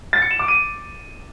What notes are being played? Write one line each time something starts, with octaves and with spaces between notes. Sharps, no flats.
A6
C#7
E7
D6
D#7